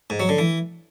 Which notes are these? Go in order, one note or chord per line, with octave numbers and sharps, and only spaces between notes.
G#2
F#3
D3
E3